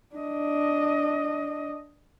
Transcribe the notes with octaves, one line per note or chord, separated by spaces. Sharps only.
D4 D#5